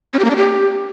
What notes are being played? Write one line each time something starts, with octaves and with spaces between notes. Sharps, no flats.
C#4
G4
A#3
D4
G4